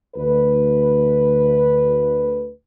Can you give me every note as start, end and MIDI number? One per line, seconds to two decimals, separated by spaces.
0.16 2.49 38
0.16 2.49 71